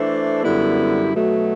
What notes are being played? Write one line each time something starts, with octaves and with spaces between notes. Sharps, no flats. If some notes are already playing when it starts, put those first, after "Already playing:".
Already playing: E3 A3 D4 A4 C5
F#2 D3 G3 B3 E4
B2 F#3 A3